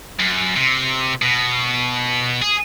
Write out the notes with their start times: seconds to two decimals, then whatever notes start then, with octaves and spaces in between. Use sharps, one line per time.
0.19 F#2
0.56 C3
1.22 B2
2.42 G#4